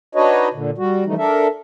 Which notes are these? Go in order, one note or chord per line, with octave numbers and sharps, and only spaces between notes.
D4 D#4 F#4 B4 C#5 D#5
A#2 D3
G3 F#4
C#3 E3 F3 G3 A3 D#4
D4 A4 A#4 E5